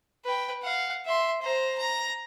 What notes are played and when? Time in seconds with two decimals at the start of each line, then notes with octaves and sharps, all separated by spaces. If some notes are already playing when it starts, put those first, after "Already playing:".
0.24 B4 G5
0.63 F5 F#5
1.06 E5 C6
1.42 C5 A#5
1.78 A#5